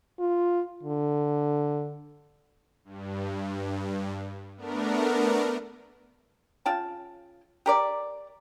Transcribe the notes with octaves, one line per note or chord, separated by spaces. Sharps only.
F4
D3
G2
A3 B3 D4 A#4
C#3 F4 G5 A5
G4 A#4 D5